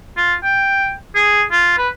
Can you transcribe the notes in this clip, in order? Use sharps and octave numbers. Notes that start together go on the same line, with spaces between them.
F4
G5
G#4
F4
B4